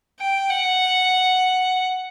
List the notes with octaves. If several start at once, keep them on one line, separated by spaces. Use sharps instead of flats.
G5
F#5